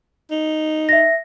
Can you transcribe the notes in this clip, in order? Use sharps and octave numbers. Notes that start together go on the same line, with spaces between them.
D#4
E5 A#6